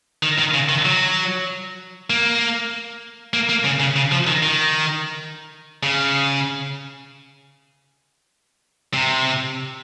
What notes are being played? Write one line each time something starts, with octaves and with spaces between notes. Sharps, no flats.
D#3
D#3
C#3
D#3
F#3
A#3
A#3
A#3
C#3
C#3
C#3
F3
D#3
D#3
C#3
C3